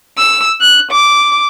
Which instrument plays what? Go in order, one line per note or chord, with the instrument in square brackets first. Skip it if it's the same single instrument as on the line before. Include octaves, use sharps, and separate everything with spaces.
[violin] E6
F#6
D6